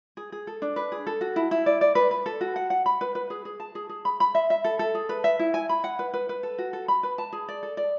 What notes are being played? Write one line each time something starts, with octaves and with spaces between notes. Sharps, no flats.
G#4
G#4
A4
D4
B4
G#4
A4
F#4
E4
E4
D5
D5
B4
B4
A4
F#4
F#5
F#5
B5
B4
B4
G#4
G#4
A5
G#4
G#4
B5
B5
E5
E5
A4
A4
G#4
B4
E5
E4
G#5
B5
F#5
B4
B4
B4
A4
F#4
A4
B5
B4
A5
G#4
D5
A4
D5